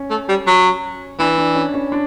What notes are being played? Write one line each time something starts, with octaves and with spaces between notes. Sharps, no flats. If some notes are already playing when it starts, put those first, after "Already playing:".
Already playing: C#4
A3
G3
F#3
E3 D4
D4
C#4
C#4
D4